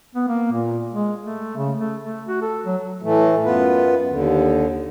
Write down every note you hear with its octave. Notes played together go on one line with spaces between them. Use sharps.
B3
A#3
A#2
G#3
A3
C#3
A3
A3
F#4
A4
F#3
A2 E3 A3
F#2 B3 F4 B4
D#2 D3